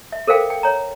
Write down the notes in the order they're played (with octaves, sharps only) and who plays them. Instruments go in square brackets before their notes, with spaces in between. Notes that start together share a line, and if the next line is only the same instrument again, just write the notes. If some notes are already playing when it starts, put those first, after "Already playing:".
[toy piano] E5
A4 A#4 C5 F5 G5
G5
C#5 A#5